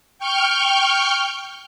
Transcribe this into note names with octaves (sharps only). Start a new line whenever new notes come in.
G5 C#6 F6 G6